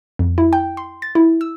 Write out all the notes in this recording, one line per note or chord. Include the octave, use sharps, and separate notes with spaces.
F2
E4
G5
C6
A6
E4
E6